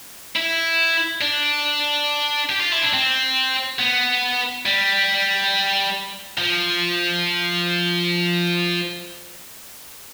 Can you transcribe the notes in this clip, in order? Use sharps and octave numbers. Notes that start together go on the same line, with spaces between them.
E4
D4
G4
F4
E4
D4
C4
B3
G3
F3